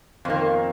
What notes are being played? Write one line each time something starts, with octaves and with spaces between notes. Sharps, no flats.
F2 D#3 A#3 C4
C4